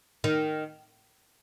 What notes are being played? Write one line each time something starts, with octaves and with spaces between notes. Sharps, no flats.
D#3